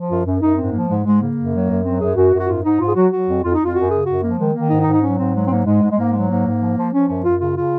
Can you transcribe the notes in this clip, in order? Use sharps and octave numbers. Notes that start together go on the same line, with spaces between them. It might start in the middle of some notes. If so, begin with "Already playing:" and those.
Already playing: F3
F#2 F4
F#2
F#2 D#4
G#2 C4
F3 A#3
G#2 G#3
G#2 G#3
C#3 A#3
F#2
F#3
F#2
F#3 C4
F#2 G#4
F#2 F#4
F#2
F#4
G#2 F4
G#2 D#4
G#2 F4
G#4
F#3 F#4
F#3 F#4
F2
F2 F4
D#4
F2
F4
F#2 F#4
C#3 G#4
F#2 F#4
F3 A#3
D#3 G#3
D#3 A#3
G#2 D#4
D#4
G#2
D#4
F#3 C#4
G#2 C4
F#3 G#3
C4
G#2 A#3
G#2 G#3
G#2
G#3
G#2 A#3
F#3 G#3
G#2 A#3
G#2
F3
F3
F3 C#4
F#2 C#4
F#2 F4
C#3 F4
C#3 F4